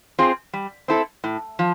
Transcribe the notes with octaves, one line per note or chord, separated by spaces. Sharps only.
C4 F4 G#4
G3
C4 E4 A4
A2
F3